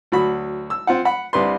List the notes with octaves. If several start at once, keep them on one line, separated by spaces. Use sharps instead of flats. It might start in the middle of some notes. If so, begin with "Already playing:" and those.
D2 F#3 F#4 B5
E6
C4 F4 F#5
F#5 B5
C2 C3 D4 B4 C6